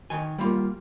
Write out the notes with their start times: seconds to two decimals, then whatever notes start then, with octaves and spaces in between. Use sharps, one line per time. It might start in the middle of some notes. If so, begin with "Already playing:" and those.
0.10 D#3 G#5
0.38 G3 A#3 F4